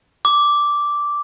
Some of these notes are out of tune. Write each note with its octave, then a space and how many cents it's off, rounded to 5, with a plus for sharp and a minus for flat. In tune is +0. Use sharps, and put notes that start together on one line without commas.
D6 -5